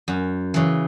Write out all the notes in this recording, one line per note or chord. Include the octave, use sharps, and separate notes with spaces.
F#2
C#3 E3